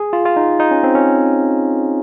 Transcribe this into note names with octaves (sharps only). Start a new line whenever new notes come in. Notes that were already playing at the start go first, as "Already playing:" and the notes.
Already playing: G#4
F4
F4
D#4
D#4
C#4
C4
C#4